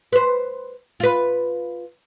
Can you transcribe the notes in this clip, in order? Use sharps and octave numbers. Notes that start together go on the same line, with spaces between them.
B4 C5
F4 B4